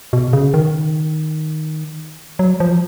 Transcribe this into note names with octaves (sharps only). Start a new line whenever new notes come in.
B2
C#3
D#3
F#3
F3